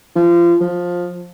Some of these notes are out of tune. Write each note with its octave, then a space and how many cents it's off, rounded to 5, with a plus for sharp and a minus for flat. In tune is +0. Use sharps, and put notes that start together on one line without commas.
F3 -30
F3 +15